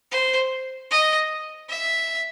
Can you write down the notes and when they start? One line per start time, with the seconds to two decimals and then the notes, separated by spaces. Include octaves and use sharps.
0.12 C5
0.91 D#5
1.70 E5